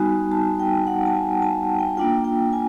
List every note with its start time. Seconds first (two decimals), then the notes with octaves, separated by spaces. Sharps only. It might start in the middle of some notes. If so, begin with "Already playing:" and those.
Already playing: G3 B3 D#4 F#4 G#5
0.32 A5
0.60 G5
0.87 F#5
1.06 A5
1.15 G#5
1.42 A5
1.79 G5
1.97 A#3 D4 F4 G5
2.24 G5
2.53 G#5